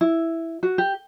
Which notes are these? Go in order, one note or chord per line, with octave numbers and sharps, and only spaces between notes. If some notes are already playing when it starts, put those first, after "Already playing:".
E4
F#4
G4